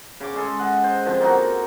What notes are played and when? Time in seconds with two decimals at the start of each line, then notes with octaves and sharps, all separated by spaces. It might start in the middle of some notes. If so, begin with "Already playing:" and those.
0.20 C#3 D6
0.34 C#3 G#3 G#4 A4
0.59 D#5 F#5
0.84 C5
1.05 D3 F3 C4
1.20 A#3 D#4 F#4